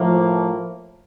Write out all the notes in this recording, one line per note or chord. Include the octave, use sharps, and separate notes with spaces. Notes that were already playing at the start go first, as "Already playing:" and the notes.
Already playing: A2 F3 A#3